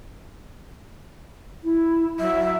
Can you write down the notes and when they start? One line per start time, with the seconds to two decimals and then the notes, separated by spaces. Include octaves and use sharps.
1.64 E4
2.19 F#3 E5